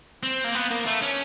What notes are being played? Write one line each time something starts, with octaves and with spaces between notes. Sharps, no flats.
C4
A#3
B3
A#3
A3
C#4